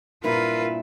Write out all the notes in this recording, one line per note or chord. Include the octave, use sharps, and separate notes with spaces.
G2 A#2 E4 F4 A#4 B4